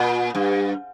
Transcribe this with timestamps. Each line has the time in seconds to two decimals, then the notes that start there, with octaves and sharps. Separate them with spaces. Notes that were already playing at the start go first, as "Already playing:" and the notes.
Already playing: A#2
0.35 G2